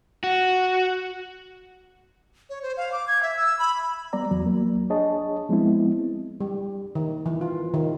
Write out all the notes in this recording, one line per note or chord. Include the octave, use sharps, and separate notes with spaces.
F#4
C#5
C5
F5
D6
G#6
E5
E6
B5
G3 B3 D5 A#5
E2 F#3
F#3 A#3
D4 G#4 C#5 D#5 A5
F3 G#3 B3 C4 E4
G3
D#3
E3
F4
D#3